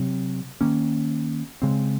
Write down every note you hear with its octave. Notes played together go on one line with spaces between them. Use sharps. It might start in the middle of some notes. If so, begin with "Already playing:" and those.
Already playing: C3 F#3 C4
D#3 A#3 C#4
C#3 G#3 C4